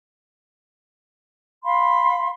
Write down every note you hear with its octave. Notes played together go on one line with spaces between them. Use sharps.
F5 B5 C6